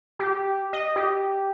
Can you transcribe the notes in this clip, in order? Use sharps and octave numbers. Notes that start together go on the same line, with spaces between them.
G4
D#5
G4